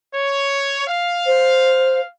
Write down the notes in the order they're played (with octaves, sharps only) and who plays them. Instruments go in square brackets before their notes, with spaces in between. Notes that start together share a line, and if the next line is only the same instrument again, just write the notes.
[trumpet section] C#5
F5
[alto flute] C5